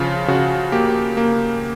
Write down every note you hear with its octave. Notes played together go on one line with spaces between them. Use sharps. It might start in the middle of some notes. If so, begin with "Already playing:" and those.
Already playing: C#3 F3 F4
C#3 F#4
A#3 G4
A#3